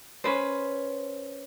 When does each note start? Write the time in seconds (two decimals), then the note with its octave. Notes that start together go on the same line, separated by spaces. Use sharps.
0.24 C#4 B4 C5